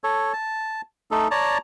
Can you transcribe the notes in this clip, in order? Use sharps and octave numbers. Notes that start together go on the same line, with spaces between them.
A4 C#5
A5
A3 D#4 A4
C#5 D5 A5 A#5